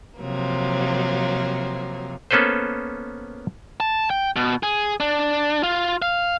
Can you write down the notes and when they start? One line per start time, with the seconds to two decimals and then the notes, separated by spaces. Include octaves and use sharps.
0.19 C3 F3 F#3 A#3
2.31 A#3 B3 C#4 A4 B4 C5
3.80 A5
4.10 G5
4.36 B2
4.63 G#4
5.00 D4
5.63 F4
6.02 F5